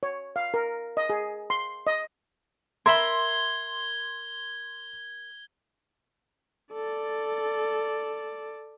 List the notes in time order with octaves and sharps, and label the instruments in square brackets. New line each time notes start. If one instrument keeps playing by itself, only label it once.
[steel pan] C#5
F5
A#4
D#5
G#4
C6
D#5
[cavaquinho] A#4 E5 B5 [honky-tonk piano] C6 [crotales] G#6 G7
[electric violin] A4 D5